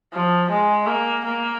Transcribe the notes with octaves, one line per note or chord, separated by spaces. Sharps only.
F3
G#3
A#3
A#3